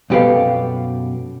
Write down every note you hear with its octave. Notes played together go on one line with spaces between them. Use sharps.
F#2 B2 G4 A4 B4 F5